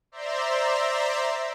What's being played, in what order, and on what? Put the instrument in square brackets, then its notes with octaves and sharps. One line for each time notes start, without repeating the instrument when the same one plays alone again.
[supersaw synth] C5 D5 E5 A#5 C6